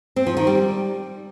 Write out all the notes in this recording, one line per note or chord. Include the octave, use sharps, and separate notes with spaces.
C4
F3
D#3
G3